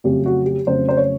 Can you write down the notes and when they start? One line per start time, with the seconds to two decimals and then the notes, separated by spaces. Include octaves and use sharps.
0.04 F2 C#3 F#3 A3 C#4 G4
0.26 F#4
0.46 G4
0.66 F2 C#3 F#3 A3 C#4 C5
0.89 C5
0.97 C#5